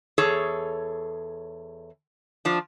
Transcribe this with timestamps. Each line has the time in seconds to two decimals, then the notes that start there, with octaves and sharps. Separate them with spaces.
0.18 E2 G#4 A4 C#5
2.45 F3 D4